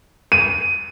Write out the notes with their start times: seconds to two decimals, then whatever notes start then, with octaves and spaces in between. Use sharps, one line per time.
0.32 D#7